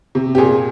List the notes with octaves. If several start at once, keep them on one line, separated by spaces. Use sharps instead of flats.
C3
G4
A#2 G#4